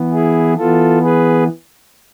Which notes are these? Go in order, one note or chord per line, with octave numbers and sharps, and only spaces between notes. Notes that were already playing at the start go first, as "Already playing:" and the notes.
Already playing: E3 B3
E4 G#4
E3 B3 F4 A4
G#4 B4